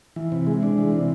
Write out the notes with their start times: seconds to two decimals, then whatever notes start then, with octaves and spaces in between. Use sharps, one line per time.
0.16 E3
0.32 C3
0.47 G#3
0.63 D4
0.78 E3
0.92 C3